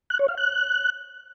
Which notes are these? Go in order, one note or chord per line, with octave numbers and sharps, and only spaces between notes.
F#6
C#5
F5
F#6